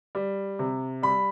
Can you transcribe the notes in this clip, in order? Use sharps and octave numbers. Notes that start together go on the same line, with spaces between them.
G3
C3
G3 B5